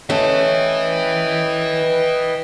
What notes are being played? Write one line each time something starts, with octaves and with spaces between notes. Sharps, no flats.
A3 C#4 B4 D#5 E5 G5